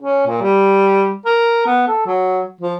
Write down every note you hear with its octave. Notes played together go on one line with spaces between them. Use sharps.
C#4
A#2
G3
A#4
B3
A4
F#3
F3